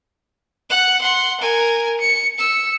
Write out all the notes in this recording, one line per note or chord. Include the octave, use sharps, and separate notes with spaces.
F#5 F#6
F#5 C6
A#4 G#5
C#7
E6 C#7